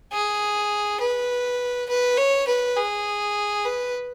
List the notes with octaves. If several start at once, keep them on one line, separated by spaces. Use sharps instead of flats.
G#4
B4
B4
C#5
B4
G#4
B4